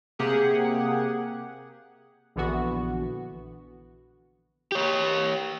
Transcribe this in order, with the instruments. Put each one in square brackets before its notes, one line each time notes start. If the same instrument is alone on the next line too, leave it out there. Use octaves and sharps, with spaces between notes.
[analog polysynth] C3 A#3 G4 G#4 F#5
A#1 D3 E3 B3 F#4
[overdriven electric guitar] G4 C#5